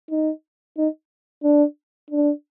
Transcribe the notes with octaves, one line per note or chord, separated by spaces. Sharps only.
D#4
D#4
D4
D4